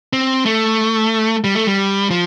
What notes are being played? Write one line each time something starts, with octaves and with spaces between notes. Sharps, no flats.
C4
A3
G3
A3
G3
F3